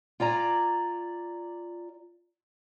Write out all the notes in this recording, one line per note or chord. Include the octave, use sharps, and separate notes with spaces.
F4 D5 G#5 A#5